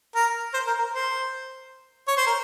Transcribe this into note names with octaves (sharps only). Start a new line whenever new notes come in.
A#4
C5
A#4
A#4
C5
C#5
C5
A#4